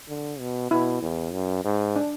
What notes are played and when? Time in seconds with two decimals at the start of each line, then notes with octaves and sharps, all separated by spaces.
0.08 D3
0.40 B2
0.71 B2 E4
1.02 E2
1.33 F#2
1.64 G#2
1.96 D4